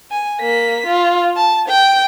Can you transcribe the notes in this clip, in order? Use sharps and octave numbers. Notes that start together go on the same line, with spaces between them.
G#5
A#3 B6
F4
A5
G5